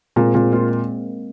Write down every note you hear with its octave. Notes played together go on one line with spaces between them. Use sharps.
A#2 G#3 C4
A#2 G#3 C4
A#3 F4